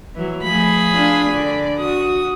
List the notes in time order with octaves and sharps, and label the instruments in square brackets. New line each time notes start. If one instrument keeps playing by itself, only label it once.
[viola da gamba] E3 F#3
[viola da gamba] F3 A3 [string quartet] G#4 B5
[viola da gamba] D4 F4
D3 D5
[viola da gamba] F#4 [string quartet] D#6